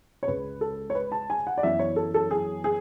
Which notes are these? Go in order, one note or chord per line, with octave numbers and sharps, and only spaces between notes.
C#5
C#2 C#3 G#3 B4
A4
C#5
B4
A5
G#5
F#5
D5
F#2 E3 B3 E5
C#5
A4
A4
G#4
G#4